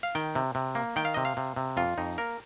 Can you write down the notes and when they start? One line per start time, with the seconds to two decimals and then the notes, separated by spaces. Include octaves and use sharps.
0.03 F5
0.15 D#3 G5
0.35 C3
0.55 C3
0.75 A#3
0.96 D#3 G5
1.05 F5
1.14 C3 D#5
1.25 F5
1.37 C3
1.56 C3
1.77 F2 F4
1.98 F2 D#4
2.18 A#3 A#4